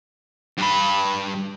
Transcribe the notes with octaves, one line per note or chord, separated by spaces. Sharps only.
G2 B5